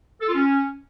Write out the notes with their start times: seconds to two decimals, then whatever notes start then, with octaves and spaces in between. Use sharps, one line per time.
0.21 A4
0.27 F4
0.34 C#4